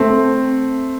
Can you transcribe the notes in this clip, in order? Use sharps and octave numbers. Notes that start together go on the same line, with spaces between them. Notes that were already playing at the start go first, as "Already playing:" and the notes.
Already playing: A3 C4